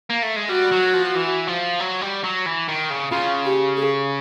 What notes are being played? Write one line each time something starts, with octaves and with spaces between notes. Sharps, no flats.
A#3
A3
G#3
G3 F#4
F#3
F3
E3
F3
F#3
G3
F#3
E3
D#3
C#3
C#3 F4
G4
G#4